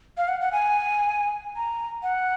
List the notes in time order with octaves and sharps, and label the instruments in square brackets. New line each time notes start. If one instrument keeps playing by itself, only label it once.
[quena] F5
F#5
F#5
G#5
A#5
F#5